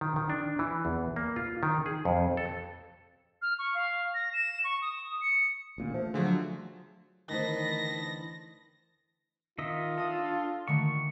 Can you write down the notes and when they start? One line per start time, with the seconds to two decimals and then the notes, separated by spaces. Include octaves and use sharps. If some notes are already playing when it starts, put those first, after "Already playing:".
0.01 D#3
0.16 D#3
0.30 D4
0.59 E3
0.85 E2
1.16 A#3
1.36 F4
1.63 D#3
1.86 G#4
2.05 F2
2.37 A4
3.42 F6
3.59 C#6
3.74 F5
4.14 A#6
4.33 E7
4.64 C#6
4.82 D#6
5.21 C#7
5.78 A1 A#2 D3
5.94 F3 A3
6.14 D3 F3 F#3 G#4
7.30 D2 D#3 E3 C5 D#5 A5 B5 A#6
9.58 D#3 F4 D#5 E5
9.98 D4 A4 D#6 A#6
10.68 D3 D#3 A3 C#6